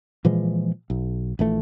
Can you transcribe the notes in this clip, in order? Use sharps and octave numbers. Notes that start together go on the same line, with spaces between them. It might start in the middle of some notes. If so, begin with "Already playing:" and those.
A#2 E3 F3 G#3
B1
A#1 E3 A3